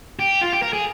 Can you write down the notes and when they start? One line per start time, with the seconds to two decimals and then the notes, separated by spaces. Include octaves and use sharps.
0.19 G4
0.41 F4
0.53 G4
0.62 A#4
0.73 G#4